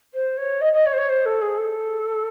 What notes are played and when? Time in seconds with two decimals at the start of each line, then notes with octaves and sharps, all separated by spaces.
0.13 C5
0.37 C#5
0.61 D#5
0.72 D#5
0.85 C#5
0.92 C5
0.97 C#5
1.09 C5
1.25 A4
1.41 G#4
1.57 A4